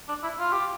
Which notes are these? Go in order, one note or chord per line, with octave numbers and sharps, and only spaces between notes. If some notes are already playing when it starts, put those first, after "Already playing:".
D4
E4
F4
G4